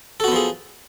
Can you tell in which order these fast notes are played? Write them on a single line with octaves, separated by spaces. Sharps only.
A4 F#4 B3 F3 G#4